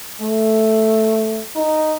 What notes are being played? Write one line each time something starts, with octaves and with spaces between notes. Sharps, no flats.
A3
D#4